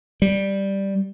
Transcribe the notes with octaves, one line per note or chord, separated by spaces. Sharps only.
G3